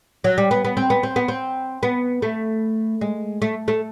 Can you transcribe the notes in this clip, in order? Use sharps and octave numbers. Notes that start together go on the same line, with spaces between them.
F#3
G3
B3
B3
C4
B3
C4
B3
C4
B3
A3
G#3
A3
A3